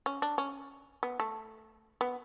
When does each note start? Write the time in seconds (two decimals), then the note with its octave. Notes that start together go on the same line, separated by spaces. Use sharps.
0.06 C#4
0.22 D4
0.38 C#4
1.03 B3
1.20 A3
2.01 B3